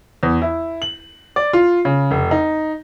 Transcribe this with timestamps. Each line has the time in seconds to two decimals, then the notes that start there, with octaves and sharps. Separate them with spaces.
0.23 E2
0.42 E4
0.82 F#7
1.36 D5
1.53 F4
1.85 C#3
2.11 F1
2.31 D#4